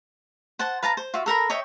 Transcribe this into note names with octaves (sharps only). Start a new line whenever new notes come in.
C5 F#5 A5
B4 F5 A5 A#5
C5
F4 F#4 E5
A4 A#4 A#5 B5
C#5 D#5 E5 G5